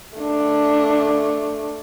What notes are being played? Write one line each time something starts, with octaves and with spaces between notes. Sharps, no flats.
A3 D4